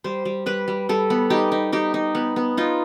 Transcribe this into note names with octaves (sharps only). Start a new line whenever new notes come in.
G3 C5
G3
G3 B4
G3
G3 A4
B3
D#4 G4
D#4
D#4 G4
D#4
B3
B3
D#4 F4